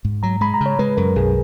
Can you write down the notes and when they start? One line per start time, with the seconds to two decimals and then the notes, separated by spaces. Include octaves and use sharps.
0.05 G#2
0.23 F#3 A#5
0.41 G#3 B5
0.54 A#5
0.61 C#3
0.66 C#5
0.79 G#3 B4
0.97 F#2 A#4
1.16 B1 G#4